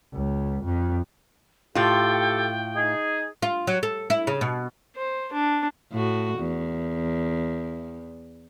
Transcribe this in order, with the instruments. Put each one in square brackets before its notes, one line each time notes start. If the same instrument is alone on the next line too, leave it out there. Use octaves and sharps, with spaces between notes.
[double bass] C#2
F2
[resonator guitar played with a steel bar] A2 F4 [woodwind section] G4 A4 [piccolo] G5
[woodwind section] D#4 G#4
[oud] F4
F#3
A4
E4
C#3
B2
[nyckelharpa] C5
D4
[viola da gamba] A2 F#4
E2